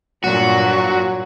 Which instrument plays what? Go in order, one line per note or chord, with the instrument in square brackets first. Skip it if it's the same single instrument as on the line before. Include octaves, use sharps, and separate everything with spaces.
[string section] G2 A#2 [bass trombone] F#3 [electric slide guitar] F#4